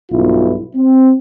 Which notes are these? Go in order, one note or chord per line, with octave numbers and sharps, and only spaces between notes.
B1 G2 E4 F4
C4